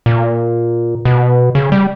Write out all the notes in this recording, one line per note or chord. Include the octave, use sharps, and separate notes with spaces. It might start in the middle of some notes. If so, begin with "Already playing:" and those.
A#2
B2
C#3
G3